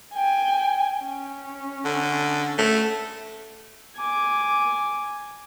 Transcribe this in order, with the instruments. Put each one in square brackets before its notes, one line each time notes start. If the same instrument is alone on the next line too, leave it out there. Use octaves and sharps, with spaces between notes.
[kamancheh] G5 G#5
C#4
[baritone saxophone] D3
A3
[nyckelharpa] G#5 D6